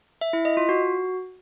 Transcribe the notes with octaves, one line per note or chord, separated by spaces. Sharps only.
E5
E4
D#5
F4
F#4